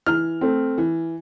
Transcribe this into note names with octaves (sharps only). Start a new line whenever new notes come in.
E3 F6
A3 C4
E3